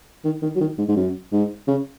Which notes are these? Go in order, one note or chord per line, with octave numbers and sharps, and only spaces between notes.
D#3
D#3
F#3
D#3
G#2
G#2
F#2
G#2
C#3